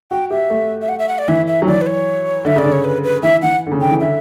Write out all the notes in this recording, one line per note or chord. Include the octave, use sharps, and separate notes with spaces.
F#4 G5
G4 E5
A3
E5
F#5
E5
F#5
D5
E3 E5
E5
F#3
E3 D5
B4
C#5
D3 E5
C#3 D5
D3
C#5
B4
B4
E3 E5
E3 F#5
D3
C#3
D3 G5
E3
D3 E5